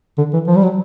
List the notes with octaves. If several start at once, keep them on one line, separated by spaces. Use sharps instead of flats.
D3
E3
F3
G3
F#3